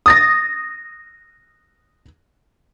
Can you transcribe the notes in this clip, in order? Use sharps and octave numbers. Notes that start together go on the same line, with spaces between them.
D#6 A6 A#6